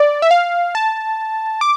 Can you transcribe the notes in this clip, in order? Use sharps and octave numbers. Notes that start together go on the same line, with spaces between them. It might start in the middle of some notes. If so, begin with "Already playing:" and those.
Already playing: D5
E5
F5
A5
D6